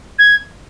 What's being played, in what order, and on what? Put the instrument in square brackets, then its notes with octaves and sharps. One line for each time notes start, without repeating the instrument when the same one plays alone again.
[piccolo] G#6